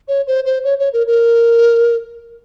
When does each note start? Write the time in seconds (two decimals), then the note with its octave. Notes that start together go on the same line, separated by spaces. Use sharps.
0.08 C#5
0.27 C5
0.45 C5
0.64 C#5
0.79 C#5
0.93 A#4
1.07 A#4